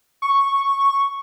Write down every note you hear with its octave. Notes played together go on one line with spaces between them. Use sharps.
C#6